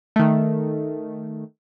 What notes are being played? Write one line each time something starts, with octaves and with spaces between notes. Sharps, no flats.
D#3 A3